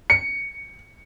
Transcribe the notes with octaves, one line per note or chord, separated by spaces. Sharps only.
C#7